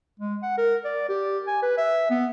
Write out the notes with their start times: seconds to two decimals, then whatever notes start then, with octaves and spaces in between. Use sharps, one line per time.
0.20 G#3
0.43 F#5
0.58 A#4
0.84 D5
1.09 G4
1.47 G#5
1.62 B4
1.78 E5
2.10 B3